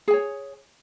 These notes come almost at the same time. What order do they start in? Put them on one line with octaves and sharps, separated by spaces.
G#4 G#5 C#5